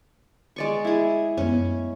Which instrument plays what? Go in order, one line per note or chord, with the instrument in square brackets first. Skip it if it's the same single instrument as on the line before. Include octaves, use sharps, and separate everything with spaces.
[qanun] G#3 D5 C#6
E4 G#4
[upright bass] F#2 B3 [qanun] C#4